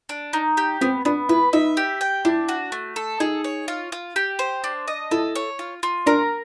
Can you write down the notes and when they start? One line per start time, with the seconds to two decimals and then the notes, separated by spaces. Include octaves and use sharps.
0.09 D4
0.33 D#4
0.57 G4
0.81 B3 C4
1.05 B3 D4
1.29 E4 B4
1.53 D#4 E5
1.77 G4
2.01 G5
2.25 D4 E4
2.49 F#4
2.72 A3
2.96 A4
3.20 D#4 G#4
3.44 C#5
3.68 F4
3.92 F4
4.16 G4
4.39 C5
4.64 D4
4.88 D#5
5.11 E4 A4
5.35 C#5
5.59 F4
5.83 F4
6.06 D4 A#4